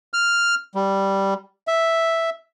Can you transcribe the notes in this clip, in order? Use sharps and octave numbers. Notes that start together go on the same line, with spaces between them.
F6
G3
E5